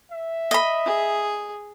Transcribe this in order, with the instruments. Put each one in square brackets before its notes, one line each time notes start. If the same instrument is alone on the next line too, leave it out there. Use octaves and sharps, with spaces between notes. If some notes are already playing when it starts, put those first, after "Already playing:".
[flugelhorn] E5
[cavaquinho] D#5 B5
[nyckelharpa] G#4